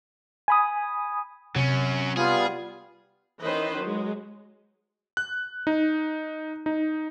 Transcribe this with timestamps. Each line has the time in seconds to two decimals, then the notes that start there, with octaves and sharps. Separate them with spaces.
0.48 G#5 B5 D#6
1.56 C3 F#3 C#4
2.17 G3 B3 F4 G#4
3.42 D#3 E3 C#4 B4 C5 D#5
3.81 F#3 G#3
5.17 F#6
5.67 D#4
6.66 D#4